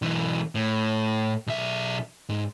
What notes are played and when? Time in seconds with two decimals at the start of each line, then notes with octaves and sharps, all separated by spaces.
0.02 B1 E3
0.55 A2
1.47 B1 E5
2.29 G#2